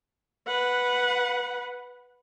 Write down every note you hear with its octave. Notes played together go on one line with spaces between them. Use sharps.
B4 F#5